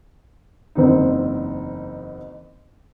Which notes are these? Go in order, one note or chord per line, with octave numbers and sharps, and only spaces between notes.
F#1 E2 C4 D#4